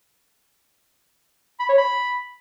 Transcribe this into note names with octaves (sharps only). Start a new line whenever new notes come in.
B5
C#5
B5